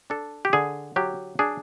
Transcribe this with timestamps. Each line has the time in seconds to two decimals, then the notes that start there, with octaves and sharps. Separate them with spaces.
0.10 D4 A4
0.45 G4
0.53 D3 G#4
0.96 F#3 G4
1.39 D4 G#4